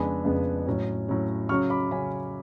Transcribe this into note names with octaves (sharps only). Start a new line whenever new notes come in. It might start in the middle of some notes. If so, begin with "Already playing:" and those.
Already playing: F2 C#3 G#3 B3 D4 G#5 B5
F2 C#3 G#3 B3 D4
A2 F#3 C#4
A2 F#3 C#4
C#3 F#3 C#4 C#6 F6
B5 D6
C#3 F#3 C#4 G#5 B5